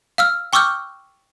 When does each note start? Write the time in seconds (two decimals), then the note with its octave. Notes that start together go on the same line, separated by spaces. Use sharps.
0.18 F5 E6 F6
0.53 G5 C#6 D6 E6 F6 G6